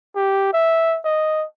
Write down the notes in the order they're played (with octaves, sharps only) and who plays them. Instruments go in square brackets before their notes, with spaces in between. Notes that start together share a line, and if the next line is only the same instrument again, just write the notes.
[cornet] G4
E5
D#5